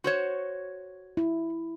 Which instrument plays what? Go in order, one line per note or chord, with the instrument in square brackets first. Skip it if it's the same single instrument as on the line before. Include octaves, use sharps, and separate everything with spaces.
[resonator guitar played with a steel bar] F#4 C5 C#5
[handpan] E4